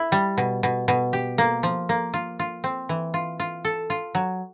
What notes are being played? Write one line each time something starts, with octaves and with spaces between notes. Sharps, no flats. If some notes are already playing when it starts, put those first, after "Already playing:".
Already playing: E4
G3
B2
B2
B2
G4
A#3
F3
A#3
F4
F4
C4
E3
F4
F4
A4
F4
F#3